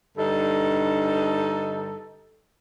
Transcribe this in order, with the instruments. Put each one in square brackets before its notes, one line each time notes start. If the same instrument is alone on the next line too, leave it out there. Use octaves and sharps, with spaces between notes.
[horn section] G2 D3 D#4 [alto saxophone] A4